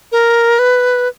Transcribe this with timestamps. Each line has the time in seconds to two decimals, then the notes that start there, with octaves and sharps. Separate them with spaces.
0.12 A#4
0.59 B4